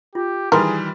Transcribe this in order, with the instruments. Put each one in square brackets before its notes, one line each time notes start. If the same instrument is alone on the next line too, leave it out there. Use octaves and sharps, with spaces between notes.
[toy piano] F4 [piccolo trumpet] G4
[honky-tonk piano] D#3 E3 G3 [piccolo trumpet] G#4 [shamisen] A#4 [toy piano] B4 C6